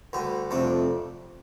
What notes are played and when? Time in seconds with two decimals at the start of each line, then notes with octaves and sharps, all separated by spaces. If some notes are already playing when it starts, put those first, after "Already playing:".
0.13 D2 D3 G3
0.51 F2 C3 A3 D4